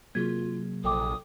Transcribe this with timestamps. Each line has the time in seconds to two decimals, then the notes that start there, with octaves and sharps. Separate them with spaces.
0.15 C3 F#3 A#3 F4 G#4 G#6
0.84 A#1 A4 G5 D6 D#6